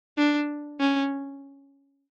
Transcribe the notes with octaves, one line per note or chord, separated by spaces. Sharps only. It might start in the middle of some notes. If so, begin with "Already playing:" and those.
D4
C#4